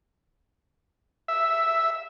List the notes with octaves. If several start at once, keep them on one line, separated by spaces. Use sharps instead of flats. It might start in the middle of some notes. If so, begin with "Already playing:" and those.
E5